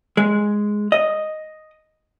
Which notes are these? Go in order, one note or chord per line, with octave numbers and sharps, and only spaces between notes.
G#3
D#5